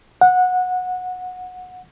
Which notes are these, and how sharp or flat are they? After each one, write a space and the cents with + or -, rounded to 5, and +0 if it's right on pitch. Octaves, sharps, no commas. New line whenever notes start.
F#5 -20